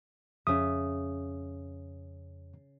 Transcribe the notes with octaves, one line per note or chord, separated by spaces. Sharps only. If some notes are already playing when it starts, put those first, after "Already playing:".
F2 C#3 E5 D#6